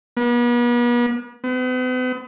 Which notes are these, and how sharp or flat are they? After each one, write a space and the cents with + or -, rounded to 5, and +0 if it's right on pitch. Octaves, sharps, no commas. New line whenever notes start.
B3 -40
B3 +45